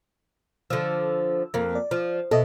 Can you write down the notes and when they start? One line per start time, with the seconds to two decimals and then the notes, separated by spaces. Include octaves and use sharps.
0.70 D3 F3 E6
1.54 F2 A#3
1.75 D5
1.91 F3
2.31 B2 A4 D#5 E5